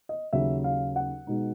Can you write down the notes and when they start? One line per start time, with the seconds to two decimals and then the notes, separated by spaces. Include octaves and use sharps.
0.09 D#5
0.33 D#2 C#3 F#3 E5
0.64 F5
0.96 F#5
1.27 B2 G#3 B3 D#4